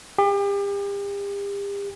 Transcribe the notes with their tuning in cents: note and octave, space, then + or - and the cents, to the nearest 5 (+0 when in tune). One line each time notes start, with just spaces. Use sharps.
G4 +40